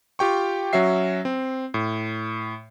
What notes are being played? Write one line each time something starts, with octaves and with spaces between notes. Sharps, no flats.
F4 G4 G5 C#6
F#3 C#4 F#4 E5 C7
C4
A2